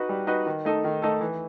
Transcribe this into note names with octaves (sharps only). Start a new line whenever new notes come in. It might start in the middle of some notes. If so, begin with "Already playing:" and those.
Already playing: D#4 F#4 B4
G3
D#4 F#4 B4
D#3
A3 D#4 A4
D#3
A3 D#4 A4
E3